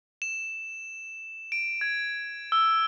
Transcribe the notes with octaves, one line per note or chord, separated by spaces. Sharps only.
E7
D7
G#6
E6